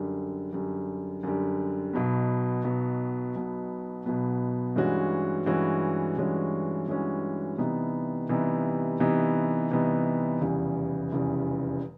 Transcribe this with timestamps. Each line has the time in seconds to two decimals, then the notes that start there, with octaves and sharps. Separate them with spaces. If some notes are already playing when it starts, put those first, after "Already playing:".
Already playing: F#2 D3 G3
0.53 F#2 D3 G3
1.23 F#2 D3 G3
1.93 B1 B2 F#3 B3
2.64 B1 B2 F#3 B3
3.35 B1 B2 F#3 B3
4.06 B1 B2 F#3 B3
4.76 G2 E3 G#3 C#4 F#4
5.46 G2 E3 G#3 C#4 F#4
6.17 G2 E3 G#3 C#4 F#4
6.88 G2 E3 G#3 C#4 F#4
7.58 C3 E3 G3 B3 D#4
8.29 C3 E3 G3 B3 D#4
8.99 C3 E3 G3 B3 D#4
9.71 C3 E3 G3 B3 D#4
10.41 F1 E2 C#3 E3 G3
11.12 F1 E2 C#3 E3 G3